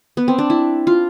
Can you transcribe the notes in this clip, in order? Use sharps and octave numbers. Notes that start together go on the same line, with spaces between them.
B3
C4
D4
E4
F4